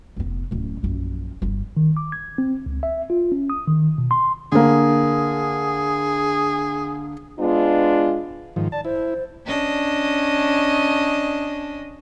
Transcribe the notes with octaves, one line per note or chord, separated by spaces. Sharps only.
F1 B3
D1 F#2
A#1 F#2
G1 G2
D#3
D6
G#6
C4
C#2
E5
F4
C#4
D#6
D#3
B2
C6
D3 A#3 G#4
G#3 B3 D4 F4
G#2 D#3 F3
D5 A5
E4 C5
C#4 D4 D#5